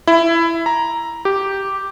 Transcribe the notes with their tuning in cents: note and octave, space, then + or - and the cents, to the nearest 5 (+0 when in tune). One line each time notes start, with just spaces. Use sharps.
E4 +15
A#5 +5
G4 -5